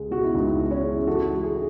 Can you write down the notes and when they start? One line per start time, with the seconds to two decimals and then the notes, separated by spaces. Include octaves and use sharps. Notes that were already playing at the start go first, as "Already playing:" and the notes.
Already playing: C#2 G#3
0.11 B2 F#4
0.23 E4
0.35 C#2 D#4
0.59 C#2
0.71 C#4 E4
0.83 G#3
1.07 A1 F#4 A4
1.31 G#3
1.43 E4 G#4